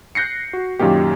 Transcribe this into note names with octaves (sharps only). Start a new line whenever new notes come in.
F#6 G6 A#6 C7 C#7
F#4
F#2 A#2 D#3 A#3 G4